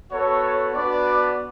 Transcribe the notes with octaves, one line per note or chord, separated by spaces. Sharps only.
B3 F#4 A4 C#5
B3 D4 F#4 B4 D5